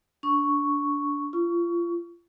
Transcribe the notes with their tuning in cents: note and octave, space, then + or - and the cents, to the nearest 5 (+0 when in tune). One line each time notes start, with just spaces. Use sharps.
D4 -15 C#6 +0
F4 -30 C#6 +20